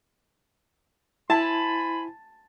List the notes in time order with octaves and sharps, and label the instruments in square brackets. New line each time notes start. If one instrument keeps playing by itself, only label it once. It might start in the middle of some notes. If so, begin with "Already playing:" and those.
[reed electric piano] E4 [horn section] C5 G#5 B5 [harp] A5